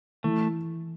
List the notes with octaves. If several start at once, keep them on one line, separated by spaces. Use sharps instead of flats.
E3 A3